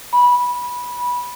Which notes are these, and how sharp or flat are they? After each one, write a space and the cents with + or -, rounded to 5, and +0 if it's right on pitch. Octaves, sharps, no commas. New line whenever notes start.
B5 -15